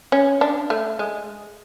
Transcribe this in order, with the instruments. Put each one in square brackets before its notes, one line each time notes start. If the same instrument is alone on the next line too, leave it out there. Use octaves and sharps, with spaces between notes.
[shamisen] C#4
D4
A3
G#3